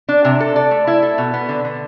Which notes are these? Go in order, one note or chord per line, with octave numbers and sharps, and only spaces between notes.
D4
C3
A4
D5
A3
E4
A4
B2
B3
D3
D3